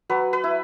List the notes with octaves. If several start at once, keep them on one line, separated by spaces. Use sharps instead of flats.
F#3 B4
B4
E4